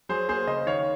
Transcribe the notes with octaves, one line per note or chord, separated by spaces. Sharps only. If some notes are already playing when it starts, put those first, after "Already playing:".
F#3 G#4 C5
A#3 G#4 C5
C#3 C5 D#5
D#3 C#5 F5